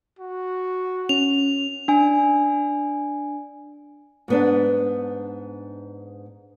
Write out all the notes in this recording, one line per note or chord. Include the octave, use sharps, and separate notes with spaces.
F#4
C#4 F7
D4 G#5
G#2 B3 D4